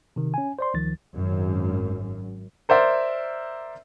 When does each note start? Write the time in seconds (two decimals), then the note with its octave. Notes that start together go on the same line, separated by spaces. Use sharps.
0.16 C3 D#3
0.34 C#4 G#5
0.59 C5 D5 C6
0.74 C#2 D#3 F3 A6
1.14 G#1 F#2
2.69 A#4 C5 D5 E5